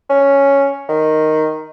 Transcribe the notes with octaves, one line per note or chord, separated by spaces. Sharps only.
C#4
D#3